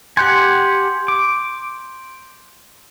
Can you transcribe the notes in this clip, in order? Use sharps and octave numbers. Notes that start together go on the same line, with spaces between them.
G4 F#5 G#5 C6 G6
D6